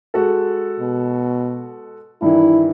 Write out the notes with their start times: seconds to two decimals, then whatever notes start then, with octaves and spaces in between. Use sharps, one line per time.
0.14 G#3 F#4 A4
0.80 B2
2.22 G2 D#3 E3 E4